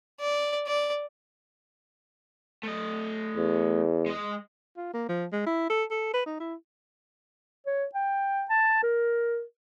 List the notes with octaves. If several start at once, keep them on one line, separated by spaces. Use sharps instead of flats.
D5
D5
A3 D#5
E2
G#3 D#5
F4
A#3
F3
G#3
E4
A4
A4
B4
D#4
E4
C#5
G5
A5
A#4